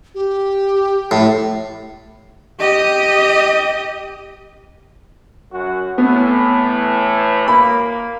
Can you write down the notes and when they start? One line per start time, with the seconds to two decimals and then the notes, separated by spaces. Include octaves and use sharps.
0.15 G4
1.11 A2
2.60 G4 D#5
5.52 F#2 F#4
5.98 A2 E3 B3
7.48 A#3 B5